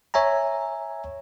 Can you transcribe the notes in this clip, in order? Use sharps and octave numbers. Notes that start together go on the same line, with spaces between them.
C#5 E5 G#5 A#5